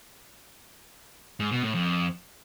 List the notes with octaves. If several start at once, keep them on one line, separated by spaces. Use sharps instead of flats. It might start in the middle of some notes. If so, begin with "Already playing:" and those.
G#2
B2
A2
F2